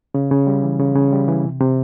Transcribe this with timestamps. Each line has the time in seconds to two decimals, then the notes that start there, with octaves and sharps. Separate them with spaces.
0.14 C#3
0.31 C#3
0.47 G3
0.63 E3
0.79 C#3
0.95 C#3
1.12 G3
1.28 E3
1.44 C3
1.60 C3